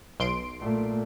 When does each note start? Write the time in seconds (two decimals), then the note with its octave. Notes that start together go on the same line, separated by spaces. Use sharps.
0.20 B1 C6 D7
0.62 A#2 A3